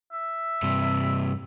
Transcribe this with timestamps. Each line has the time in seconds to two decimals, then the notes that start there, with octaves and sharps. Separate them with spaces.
0.13 E5
0.62 G2 C3